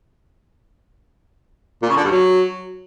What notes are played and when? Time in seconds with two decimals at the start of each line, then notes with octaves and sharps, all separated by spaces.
1.82 A#2
1.90 C#3
1.97 D3
2.04 G2
2.11 F#3